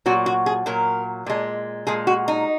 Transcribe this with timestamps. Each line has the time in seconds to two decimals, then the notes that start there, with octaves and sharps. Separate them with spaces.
0.06 A#2 F#3 F#4
0.26 F#4
0.46 G#4
0.66 A#2 F#3 A#4
1.26 A#2 G#3
1.87 A#2 G#3 G#4
2.07 F#4
2.28 D#4